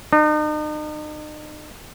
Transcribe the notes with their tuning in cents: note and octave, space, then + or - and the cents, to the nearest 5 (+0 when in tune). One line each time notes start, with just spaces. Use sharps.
D#4 -40